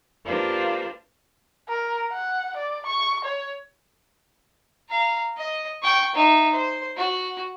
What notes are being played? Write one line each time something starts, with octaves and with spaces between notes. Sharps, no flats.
A#3 D4 F4 G4 B4 C5
A#4
F#5
D5
C#6
C#5
F5 A#5
D#5
G5 C#6
D#4 E5
C5
F#4